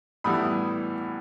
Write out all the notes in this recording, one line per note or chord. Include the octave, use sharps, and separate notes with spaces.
A2 E3 G3 B3 E4 B5 D#6